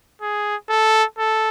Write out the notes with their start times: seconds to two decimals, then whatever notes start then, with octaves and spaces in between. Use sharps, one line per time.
0.21 G#4
0.70 A4
1.19 A4